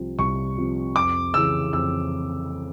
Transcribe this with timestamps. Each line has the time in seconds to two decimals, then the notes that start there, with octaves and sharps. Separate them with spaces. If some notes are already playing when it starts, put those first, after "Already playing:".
Already playing: C2 C3 F3
0.18 C2 C#6
0.57 C3 F3
0.96 F2 D6
1.34 C#3 E3 E6
1.73 F2 E6